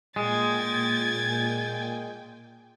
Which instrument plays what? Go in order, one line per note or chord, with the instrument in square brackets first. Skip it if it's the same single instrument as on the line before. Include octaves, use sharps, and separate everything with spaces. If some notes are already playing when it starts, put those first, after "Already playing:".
[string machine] A#2 G5 G#5 [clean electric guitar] G#3 [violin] G#6 A6